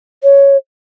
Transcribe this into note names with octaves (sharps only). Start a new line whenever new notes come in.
C#5